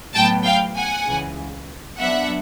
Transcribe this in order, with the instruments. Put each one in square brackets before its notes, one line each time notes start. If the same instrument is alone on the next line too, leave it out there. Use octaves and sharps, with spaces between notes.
[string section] A2 F#3 B3 [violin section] G5 A5
[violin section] F5 G5
F#5 G#5
[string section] C#2 C#3 E3
[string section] F#3 B3 D4 [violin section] E5 F#5